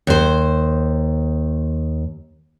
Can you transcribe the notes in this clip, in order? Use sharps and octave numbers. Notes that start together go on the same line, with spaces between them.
D#2 C5